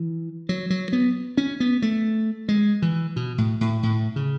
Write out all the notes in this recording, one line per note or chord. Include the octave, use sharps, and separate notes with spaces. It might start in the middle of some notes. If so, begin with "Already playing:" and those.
Already playing: E3
F#3
F#3
B3
C#4
B3
A3
G#3
E3
B2
A2
A2
A2
C#3